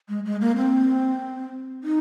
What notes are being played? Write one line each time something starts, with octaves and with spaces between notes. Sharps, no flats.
G#3
G#3
A#3
C4
D#4